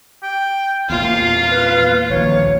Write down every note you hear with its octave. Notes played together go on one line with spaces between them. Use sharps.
G5
E2 A#2 F4 F5
B4
A#1 D#2 C#5